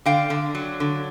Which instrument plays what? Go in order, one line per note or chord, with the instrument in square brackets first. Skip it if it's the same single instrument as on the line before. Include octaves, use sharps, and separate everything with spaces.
[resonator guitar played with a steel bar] D3 F5 G5
D3
F#3
D3